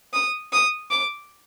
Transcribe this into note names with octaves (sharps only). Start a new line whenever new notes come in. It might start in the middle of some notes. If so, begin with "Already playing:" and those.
D#6
D#6
D6